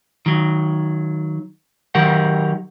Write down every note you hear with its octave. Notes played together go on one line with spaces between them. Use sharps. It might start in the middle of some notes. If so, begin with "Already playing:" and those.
D#3 F#3
D#3 F#3 G4 A#4 F#5